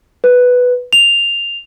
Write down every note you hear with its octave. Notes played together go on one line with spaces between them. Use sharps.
B4
F7